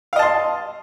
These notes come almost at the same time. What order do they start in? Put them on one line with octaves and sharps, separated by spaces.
F5 D#5 A5 C6